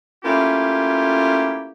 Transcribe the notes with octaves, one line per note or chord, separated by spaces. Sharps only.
A3 A#3 C#4 E4 F4 G4